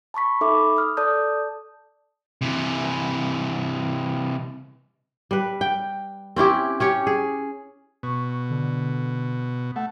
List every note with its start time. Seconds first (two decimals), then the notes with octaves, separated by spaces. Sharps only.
0.14 A5 B5 C#6 B6
0.41 D#4 A4 E5 B5 D6
0.77 D#6 F6
0.97 A4 D5 A5 D#6 G6
2.41 C3 E3
5.31 G3 B4
5.61 G5
6.36 C4 C#4 E4 G4
6.80 C#4 G4 C#5
7.07 G#4
8.03 B2 C#6
8.50 D3
9.76 A3 F#5